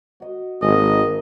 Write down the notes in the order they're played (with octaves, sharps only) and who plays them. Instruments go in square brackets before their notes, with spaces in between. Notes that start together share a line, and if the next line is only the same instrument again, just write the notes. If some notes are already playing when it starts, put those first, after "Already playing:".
[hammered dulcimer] F#4 D#5
[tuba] G#1 [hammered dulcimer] G#3 A#3 [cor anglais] D#5